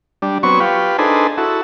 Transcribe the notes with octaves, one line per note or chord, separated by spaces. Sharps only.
G3 D4
F#3 B3 C4 C#5 C#6
F4 G4 B4
D4 D#4 G#4 A4 B4 C5
E4 F#4 A4